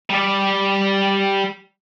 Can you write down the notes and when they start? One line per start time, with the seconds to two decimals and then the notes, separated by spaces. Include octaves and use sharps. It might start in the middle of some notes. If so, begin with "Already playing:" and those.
0.10 G3 D5